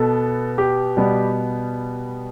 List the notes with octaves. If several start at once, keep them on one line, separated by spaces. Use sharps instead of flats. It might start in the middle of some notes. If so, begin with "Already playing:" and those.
Already playing: B2 B3 A4
G4
B2 G3 B3